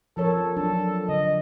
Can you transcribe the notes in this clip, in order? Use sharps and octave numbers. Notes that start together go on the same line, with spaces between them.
F3 A4 A#4 C#5
F#3 D4 A4
D3 D#5